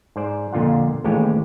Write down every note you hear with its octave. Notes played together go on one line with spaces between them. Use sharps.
G#2 C5 D5
F2 A#2 D3 F4 F#5
A1 D#2 A2 G#3 G4 C#5